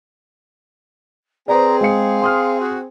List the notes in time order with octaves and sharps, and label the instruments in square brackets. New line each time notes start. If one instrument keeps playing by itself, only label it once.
[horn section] C4 G#4 [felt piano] B4 C5 D5 [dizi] A#5
[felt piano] G#3 C#7 [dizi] F5
[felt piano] C6 D#6 F6
[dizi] F#4